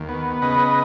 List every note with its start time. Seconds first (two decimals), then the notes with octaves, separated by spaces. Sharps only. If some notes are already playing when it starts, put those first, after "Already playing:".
Already playing: D#2
0.09 B3
0.42 C#3 B4 D#5